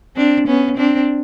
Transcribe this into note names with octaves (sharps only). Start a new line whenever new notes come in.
C4 D4
B3 C#4
C4 D4